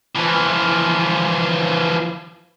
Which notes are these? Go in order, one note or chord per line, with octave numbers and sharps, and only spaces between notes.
E3 F3